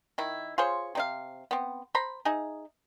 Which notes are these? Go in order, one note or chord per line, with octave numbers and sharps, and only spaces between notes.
D#3 E4
F4 G#4 C5 C#5
C3 D#4 F5
B3 C4
C5 A#5 B5
D#4 G#4 E5